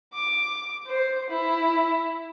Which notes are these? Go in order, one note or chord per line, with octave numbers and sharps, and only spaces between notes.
D6
C5
E4